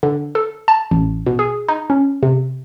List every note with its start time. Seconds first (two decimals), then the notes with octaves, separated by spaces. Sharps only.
0.03 D3
0.35 A4
0.68 A5
0.91 A1
1.26 B2
1.39 G#4
1.68 D#4
1.90 C#4
2.23 C3